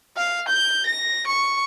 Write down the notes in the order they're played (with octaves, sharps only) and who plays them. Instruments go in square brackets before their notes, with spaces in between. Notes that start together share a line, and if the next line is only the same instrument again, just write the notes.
[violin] F5
G6
A#6
C#6